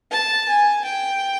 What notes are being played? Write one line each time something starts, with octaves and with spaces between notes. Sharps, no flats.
A5
G#5
G5